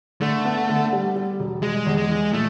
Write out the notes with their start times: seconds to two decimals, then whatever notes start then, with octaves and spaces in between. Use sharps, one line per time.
0.21 D3 A3
0.45 B3
0.69 D3
0.93 G3
1.16 G3
1.40 E1
1.63 G3 G#3
1.86 E2
1.97 G#3
2.10 E3
2.33 A#2 A3